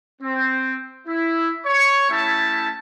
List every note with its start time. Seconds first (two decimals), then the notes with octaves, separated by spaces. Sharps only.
0.21 C4
1.07 E4
1.65 C#5 C#6
2.09 A3 C#4 E4 G4 E5 A5